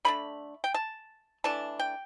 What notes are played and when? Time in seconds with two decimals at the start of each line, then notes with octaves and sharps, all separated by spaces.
0.05 D3 A3 D4 B5
0.64 G5
0.74 A5
1.44 E3 A3 D4 A5
1.79 G5